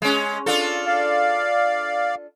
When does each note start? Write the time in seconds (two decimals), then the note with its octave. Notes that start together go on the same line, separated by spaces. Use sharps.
0.02 G#3 C#4
0.46 D4 F4 A4
0.86 D5 F5